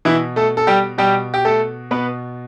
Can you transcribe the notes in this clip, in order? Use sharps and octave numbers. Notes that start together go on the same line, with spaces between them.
B2 E3 E4
A3 A4
A4
G3 G4
B2 G3 G4
G4
A3 A4
B2 B3 B4